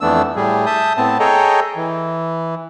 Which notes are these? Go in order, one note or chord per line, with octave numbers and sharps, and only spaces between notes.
F2 E3 A3 B3 D4 E6
A2 G3 G#4
E5 A5 D#6 G6
A2 B3 C4 A5
G#4 A4 C#5 D#5 G5 A#5
E3